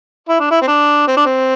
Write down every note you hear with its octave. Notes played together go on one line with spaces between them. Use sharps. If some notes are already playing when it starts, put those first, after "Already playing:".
E4
D4
E4
C4
D4
C4
D4
C4